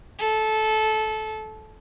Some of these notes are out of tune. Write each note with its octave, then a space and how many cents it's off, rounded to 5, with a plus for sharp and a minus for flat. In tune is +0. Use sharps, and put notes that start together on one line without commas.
A4 -20